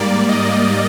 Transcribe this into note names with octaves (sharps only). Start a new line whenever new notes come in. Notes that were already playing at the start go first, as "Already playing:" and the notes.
Already playing: G#2 G3 A#3 D5
D#5